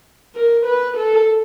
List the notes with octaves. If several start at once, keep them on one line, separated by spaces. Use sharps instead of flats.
A#4
B4
A4